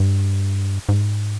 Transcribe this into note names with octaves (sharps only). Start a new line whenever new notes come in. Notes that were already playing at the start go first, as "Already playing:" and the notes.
Already playing: G2
G#2